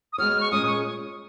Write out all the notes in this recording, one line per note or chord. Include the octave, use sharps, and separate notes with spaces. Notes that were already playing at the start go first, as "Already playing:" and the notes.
D#6
G#3 B3 F#4 C#5 F6
C#6
A#2 G#3 C#4 F4 D#6
C#6